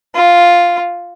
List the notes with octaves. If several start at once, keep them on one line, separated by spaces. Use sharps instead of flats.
F4